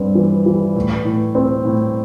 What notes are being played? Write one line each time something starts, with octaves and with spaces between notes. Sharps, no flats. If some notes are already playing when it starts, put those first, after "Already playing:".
Already playing: G2 C4
E3
E3
A2
A2
C4
A2